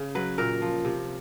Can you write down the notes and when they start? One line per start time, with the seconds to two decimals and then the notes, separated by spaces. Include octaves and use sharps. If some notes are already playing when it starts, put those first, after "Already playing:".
Already playing: C#3
0.15 F#3 B4
0.38 A#2 A#4
0.62 F3
0.85 C3